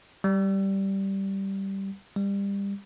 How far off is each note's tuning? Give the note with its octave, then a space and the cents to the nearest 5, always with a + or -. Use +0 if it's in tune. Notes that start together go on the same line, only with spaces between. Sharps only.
G3 -10
G3 +25